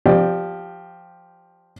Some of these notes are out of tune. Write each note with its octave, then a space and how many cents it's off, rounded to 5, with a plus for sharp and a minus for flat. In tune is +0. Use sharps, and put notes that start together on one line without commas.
F3 +0 G4 +0 D5 +30